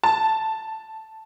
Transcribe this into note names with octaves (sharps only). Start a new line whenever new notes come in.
A5